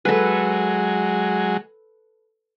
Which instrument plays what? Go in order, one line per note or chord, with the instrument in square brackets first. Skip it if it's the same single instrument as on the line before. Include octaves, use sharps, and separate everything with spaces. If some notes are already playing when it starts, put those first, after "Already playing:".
[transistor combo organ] F#3 G#3 [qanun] A4 B4